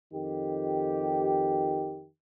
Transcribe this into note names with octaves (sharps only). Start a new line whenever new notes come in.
F2 D#3 G4